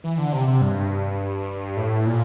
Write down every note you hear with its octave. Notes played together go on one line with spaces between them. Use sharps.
E3
D3
C3
C3
G2
A2
A#2